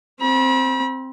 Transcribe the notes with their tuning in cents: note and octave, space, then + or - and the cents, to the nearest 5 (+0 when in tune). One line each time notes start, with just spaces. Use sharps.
C4 +0 B5 -40